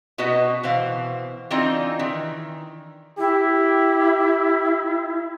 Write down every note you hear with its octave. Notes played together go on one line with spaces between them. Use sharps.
B2 B3 F#4 B4 D#5 A5
B2 E3 C5 F5
E3 C4 D4 D#4 F4 D#5
D#3 E3
E4 G4